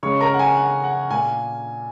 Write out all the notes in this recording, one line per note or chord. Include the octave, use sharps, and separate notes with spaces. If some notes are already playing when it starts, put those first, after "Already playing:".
C#3 G#3 C#5 C#6
A#4 A#5
F#5
G#5
F#5
F#5
A#2 A#3 G#5